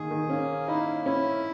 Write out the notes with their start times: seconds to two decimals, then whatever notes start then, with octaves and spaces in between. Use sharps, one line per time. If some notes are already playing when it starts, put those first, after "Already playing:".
Already playing: D#3 A#3 G#4
0.11 D#3
0.30 A#3 C#4
0.68 D#4 E4
1.05 C#4 E4